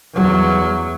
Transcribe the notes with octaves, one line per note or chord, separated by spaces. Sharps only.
E2 F#3